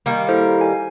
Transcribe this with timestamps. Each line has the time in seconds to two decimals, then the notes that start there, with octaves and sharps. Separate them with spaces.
0.06 D#3 G3 A#3
0.29 E4 A4 C5
0.61 G#5